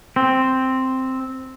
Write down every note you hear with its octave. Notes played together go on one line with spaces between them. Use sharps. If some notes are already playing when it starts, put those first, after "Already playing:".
C4